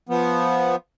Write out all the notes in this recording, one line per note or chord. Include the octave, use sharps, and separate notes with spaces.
F3 B3